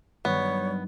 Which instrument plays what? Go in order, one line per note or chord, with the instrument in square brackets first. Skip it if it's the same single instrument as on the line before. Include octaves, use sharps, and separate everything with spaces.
[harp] G2 D#3 F#3 [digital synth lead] G3 [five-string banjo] B3 [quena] C#5